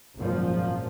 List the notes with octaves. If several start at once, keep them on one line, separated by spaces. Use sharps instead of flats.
G#1 F#2 A#2 F3